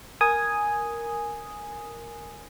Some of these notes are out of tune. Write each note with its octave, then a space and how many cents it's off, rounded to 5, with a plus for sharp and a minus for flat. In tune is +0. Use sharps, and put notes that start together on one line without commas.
A#4 +0 G#5 +0 D#6 +0